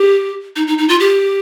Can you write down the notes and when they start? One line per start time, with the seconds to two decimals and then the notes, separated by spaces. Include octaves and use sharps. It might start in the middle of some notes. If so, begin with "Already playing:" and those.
Already playing: G4
0.56 D#4
0.67 D#4
0.78 D#4
0.89 F4
1.00 G4